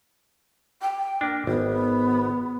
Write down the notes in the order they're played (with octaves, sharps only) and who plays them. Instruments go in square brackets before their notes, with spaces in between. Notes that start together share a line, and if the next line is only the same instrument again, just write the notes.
[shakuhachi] G5
[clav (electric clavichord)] A#3 D4
[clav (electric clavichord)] G#1 [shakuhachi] B3